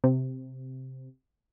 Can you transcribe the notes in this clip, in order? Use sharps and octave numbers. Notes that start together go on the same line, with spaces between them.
C3